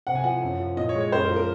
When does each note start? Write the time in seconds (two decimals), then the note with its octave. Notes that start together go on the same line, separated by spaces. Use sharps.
0.07 C3 F#5
0.15 G#5
0.24 F3 F#5
0.42 F#2
0.60 F3
0.77 A#2 D#5
0.89 C#5
0.95 G#3
1.01 C#5
1.12 F#2 C5
1.24 A#4
1.30 F3
1.36 A#4